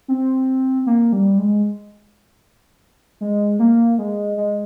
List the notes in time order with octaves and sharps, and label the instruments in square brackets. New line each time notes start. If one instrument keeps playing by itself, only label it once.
[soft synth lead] C4
A#3
G3
G#3
G#3
A#3
G#3
G#3